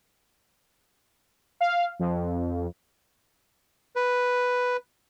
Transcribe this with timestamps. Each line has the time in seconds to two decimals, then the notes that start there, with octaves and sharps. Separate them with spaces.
1.61 F5
1.99 F2
3.96 B4